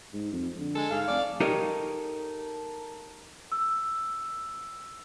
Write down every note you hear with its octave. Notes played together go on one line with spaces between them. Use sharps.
G#2
F2
D3
G#3 A4
G#2 G#4 F5
F1 D5
D#4 G4 A4 A#4 C#5 D#5
E6